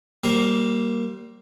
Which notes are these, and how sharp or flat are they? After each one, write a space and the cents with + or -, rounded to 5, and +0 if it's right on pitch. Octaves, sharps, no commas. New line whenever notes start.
G3 -25 A#3 +0 C5 +15